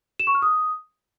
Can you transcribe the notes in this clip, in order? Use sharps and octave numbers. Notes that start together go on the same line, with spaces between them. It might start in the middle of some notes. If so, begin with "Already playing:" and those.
E7
C#6
F6
D#6